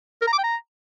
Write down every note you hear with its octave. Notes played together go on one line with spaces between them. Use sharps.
A#4
A#5
D6
G5
A#5